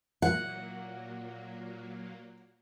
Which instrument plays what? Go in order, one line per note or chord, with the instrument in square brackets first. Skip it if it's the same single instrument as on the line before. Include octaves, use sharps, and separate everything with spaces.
[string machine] A#2 F#3 A#3 [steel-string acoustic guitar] F#5